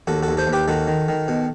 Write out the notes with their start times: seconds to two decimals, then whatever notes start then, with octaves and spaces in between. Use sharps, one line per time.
0.07 D#2 F#4 A4
0.23 F#4 A4
0.28 D#2
0.37 A4 C5
0.47 D#2
0.52 G4 B4
0.68 D#3 F#4 A4
0.88 D#3
1.08 D#3
1.28 B2